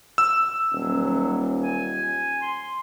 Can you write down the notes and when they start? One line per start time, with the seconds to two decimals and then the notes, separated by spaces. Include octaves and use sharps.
0.18 E6
0.73 D#1 F#3
1.62 G#5
2.42 C6